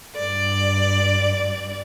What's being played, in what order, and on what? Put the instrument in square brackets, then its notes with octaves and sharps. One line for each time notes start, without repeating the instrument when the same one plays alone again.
[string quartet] G2 D5